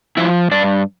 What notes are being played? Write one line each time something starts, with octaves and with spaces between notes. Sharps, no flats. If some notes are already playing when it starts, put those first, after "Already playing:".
F3 E4 E5
G2 D4 D5